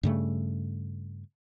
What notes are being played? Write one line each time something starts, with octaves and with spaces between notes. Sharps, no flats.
G2 C#3 A3